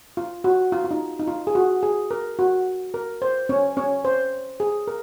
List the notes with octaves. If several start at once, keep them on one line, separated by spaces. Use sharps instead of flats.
F4
F#4
F4
F4
D#4
D#4
F4
G#4
F#4
G#4
A#4
F#4
A#4
C5
C#4 C#5
C#4 C#5
C5
G#4
A#4